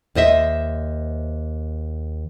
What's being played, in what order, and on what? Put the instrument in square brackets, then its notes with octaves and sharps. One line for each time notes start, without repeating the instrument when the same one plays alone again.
[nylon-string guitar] D#2 C5 D#5 E5